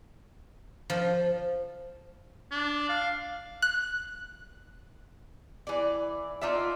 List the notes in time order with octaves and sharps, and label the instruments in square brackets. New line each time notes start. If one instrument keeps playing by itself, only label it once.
[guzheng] F3
[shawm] D4
F5
[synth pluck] F#6
[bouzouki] E3 D5
D#4 F4 D5 E5